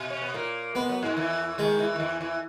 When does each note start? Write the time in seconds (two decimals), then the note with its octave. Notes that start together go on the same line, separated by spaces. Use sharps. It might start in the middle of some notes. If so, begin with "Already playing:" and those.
Already playing: B2
0.10 C#4
0.21 B3
0.34 A#2 A#3
0.75 G#3 B3
0.89 F#3
1.03 G#2 G#3
1.17 E2 E3
1.58 D#2 D#3 G#3
1.79 E2 E3
1.96 D#3
2.00 E2 E3
2.21 E2 E3